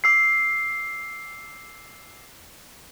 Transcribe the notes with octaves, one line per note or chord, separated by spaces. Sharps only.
D6 E6 C7